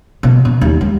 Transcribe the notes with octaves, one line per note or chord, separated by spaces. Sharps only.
B2
B2
D#2
G#3